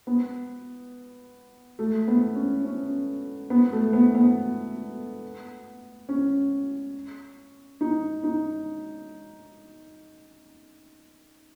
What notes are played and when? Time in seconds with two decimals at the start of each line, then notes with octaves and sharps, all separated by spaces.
0.07 B3
1.79 A3
2.08 B3
2.35 C#4
2.65 C#4
3.50 B3
3.73 A3
3.93 B3
4.15 B3
6.09 C#4
7.81 D#4
8.24 D#4